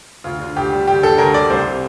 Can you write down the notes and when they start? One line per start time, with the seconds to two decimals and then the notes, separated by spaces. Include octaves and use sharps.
0.24 D2 F4
0.40 D3
0.56 D2 G4
0.72 G3
0.87 D2 G4
1.02 D3 A4
1.18 D2 A#4
1.34 G3 D5
1.50 C2 C5
1.66 C3